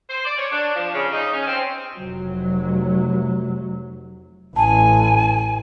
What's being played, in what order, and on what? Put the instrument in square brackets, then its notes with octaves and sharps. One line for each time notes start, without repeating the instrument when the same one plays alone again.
[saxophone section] C5
D5
C#5
D4
F3
C#3
D#4
C#4
C4
[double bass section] F1 F#3
[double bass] A1 [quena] G#5 [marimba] A5